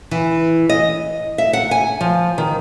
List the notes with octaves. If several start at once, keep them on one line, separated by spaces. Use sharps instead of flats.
E3
D#5
E5
F#5
G#5
F3
D#3